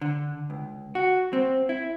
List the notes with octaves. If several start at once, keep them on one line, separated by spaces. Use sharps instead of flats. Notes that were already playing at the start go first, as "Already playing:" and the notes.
D3
C#2
F#4
C4
E4